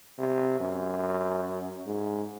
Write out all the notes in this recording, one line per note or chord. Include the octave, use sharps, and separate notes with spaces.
C3
F#2
G#2